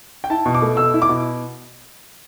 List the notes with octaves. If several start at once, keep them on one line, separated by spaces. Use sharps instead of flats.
G5
E4 A5
B2
D6
A3
B2 E6
E4
D6
B2